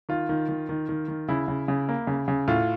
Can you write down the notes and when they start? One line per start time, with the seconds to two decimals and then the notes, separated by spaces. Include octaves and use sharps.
0.09 D#3 F4
0.29 D#3
0.49 D#3
0.69 D#3
0.89 D#3
1.08 D#3
1.28 C#3 E4
1.48 C#3
1.68 C#3
1.89 A#3
2.07 C#3
2.28 C#3
2.48 A2 F4